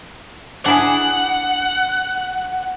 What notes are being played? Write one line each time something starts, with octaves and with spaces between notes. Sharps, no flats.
D4 E4 G#4 F#5